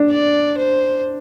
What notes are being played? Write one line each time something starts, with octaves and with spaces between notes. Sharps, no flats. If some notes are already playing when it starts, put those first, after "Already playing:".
Already playing: D4
D5
C5